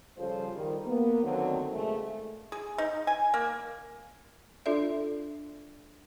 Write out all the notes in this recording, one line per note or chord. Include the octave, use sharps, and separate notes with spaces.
C#3 F3 G3 F4 A4 C5
D#3 G3
A#3 B3
D2 D3 D#3 F#3 C4
A#2 C#3 G#3 A3
G#4
D#4
G#5
A#3
D4 F4 A4 D5 E5